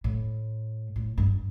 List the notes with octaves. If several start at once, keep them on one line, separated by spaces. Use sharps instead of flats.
A2
A2
G2